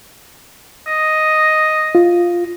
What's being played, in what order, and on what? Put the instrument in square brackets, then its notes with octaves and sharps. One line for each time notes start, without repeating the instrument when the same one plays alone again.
[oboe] D#5
[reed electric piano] F4